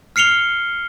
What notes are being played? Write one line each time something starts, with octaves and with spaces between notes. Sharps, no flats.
F6 C7 C#7 F7 G7